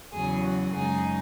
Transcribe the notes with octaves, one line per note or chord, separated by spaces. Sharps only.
E2 C#3 F#3 G#4
F#4
F#2 C#3 G#3 D#4 G#4